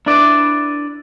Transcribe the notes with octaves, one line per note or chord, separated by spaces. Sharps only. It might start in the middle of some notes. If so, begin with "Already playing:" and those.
D4 E4 B4 D5